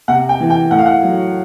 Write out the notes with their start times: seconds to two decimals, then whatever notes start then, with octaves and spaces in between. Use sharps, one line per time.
0.08 C3 F#5
0.29 G5
0.40 E3
0.50 G5
0.71 A2 F#5
0.79 F5
0.86 F#5
1.03 F#3